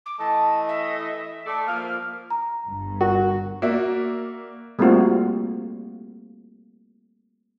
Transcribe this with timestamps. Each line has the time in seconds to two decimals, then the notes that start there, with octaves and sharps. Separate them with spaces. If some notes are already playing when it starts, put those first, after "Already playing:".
0.06 D6
0.19 E3 A3 D#5 A5
0.68 E5
1.45 A3 D5
1.67 F3 A#3 F6
2.30 A#5
2.68 G1 G2
3.01 F#4 A#4
3.62 A#3 F#4 D5 E5
4.79 G3 A3 A#3 C4 F4 F#4